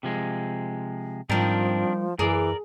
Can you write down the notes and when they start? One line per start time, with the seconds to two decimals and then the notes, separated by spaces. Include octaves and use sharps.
0.03 C3 F3 G#3
1.30 G#2 D#3 F3 G3 C4 D4 A#4
2.19 F#2 E3 G#4 A#4 D5